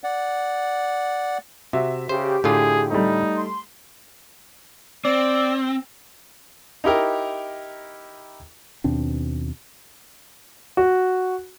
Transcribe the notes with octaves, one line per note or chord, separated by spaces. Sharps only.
D5 F#5
C3 F#4 E5
C#3 G4 C5
A2 D3 F4 G#4
G3 A3 D#4
C6
C4 D5
D#4 E4 G4 A#4
D#2 B2 C4 D4
F#4